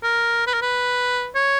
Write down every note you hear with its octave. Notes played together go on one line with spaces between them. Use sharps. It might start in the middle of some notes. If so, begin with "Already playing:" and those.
A#4
B4
A#4
B4
C#5